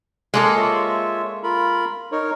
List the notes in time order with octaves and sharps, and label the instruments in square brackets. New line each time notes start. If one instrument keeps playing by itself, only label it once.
[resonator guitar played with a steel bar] G#3 A#3 A4
[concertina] F4 C#5 E5
F4 A#4 B5
D#4 A#4 C#5